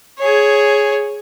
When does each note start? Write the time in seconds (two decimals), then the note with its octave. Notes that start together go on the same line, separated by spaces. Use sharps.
0.19 G#4 C#5